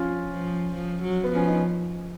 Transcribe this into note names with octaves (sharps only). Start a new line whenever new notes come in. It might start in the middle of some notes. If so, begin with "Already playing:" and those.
Already playing: F3 C#4 F4
F3
F3
F#3
B3
F3 C#4
D#4